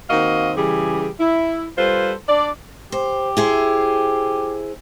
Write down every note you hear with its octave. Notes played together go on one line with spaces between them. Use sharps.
D#3 A#3 C4 F#4 D#5 F5
C#3 E3 G3 G4 G#4
E4
G3 F4 A4 B4 C5
D4 D5
G4 C5
E4 G#4 C5